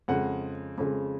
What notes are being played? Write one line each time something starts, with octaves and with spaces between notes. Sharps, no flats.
F2 C#3 G#3 F#5
F2 C#3 G#3